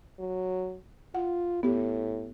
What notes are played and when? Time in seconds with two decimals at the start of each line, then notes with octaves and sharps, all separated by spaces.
0.19 F#3
1.15 F4 F#5
1.63 A2 B3 G4